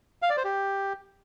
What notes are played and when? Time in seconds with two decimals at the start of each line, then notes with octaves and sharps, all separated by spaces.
0.22 F5
0.30 D5
0.37 C5
0.44 G4